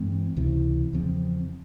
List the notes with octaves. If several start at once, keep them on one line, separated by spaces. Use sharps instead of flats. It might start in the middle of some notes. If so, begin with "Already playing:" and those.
Already playing: G2 E3 G#3 C4
C#2 C3 E3
E2 C#3 F3 C4